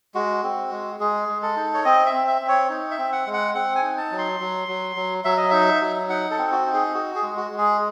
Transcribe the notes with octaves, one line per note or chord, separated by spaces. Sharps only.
G#3 F#4
C4
G#3
G#3 G#4
G#3
A4
D#4
C#5
C4 D#5
E5
C4
E5
C4
C#5
D#4
E5
C4
F#5
G#3
F#5
C4 F#5
G#5
D#4
A5
F#3
C6
F#3
F#3
F#3
F#3 E5
D#5
D#4 E5
F#3
D#4 F#5
A4
C4
F#4
D#4
G#4
F#4
G#4
G#3
F#4
G#3
G#4